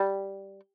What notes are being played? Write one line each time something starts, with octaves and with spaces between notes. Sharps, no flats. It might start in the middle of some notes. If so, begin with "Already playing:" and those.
Already playing: G3